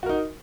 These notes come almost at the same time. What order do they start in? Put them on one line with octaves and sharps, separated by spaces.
F#4 A#4 D#4